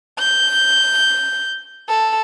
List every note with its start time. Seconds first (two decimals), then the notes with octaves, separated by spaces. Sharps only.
0.19 G6
1.89 A4